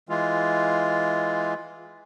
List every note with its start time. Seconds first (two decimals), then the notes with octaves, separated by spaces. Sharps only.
0.09 E3 G#3 F4